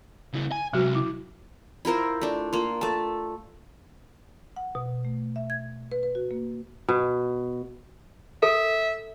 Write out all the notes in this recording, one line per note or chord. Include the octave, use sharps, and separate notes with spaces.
C#3 E4
G#5
C3 F#3 F#4 A#4
E4
E4 F4 A#4 C5
A3 D4
A#3 F4
A3 A5
F#5
B2
A3
E5
G#6
B4
B4
F#4
A#3
B2
A4 E5